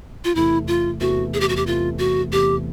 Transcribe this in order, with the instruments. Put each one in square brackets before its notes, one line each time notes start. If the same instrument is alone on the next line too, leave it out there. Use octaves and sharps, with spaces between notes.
[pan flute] F4
[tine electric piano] E2 C3 E3 A3 [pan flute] E4
[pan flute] F4
[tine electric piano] E2 C3 E3 A3 [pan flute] F#4
[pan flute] G#4
G4
F#4
G4
[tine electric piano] E2 C3 E3 A3 [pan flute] F4
[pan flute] F#4
[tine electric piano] E2 C3 E3 A3 [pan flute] G4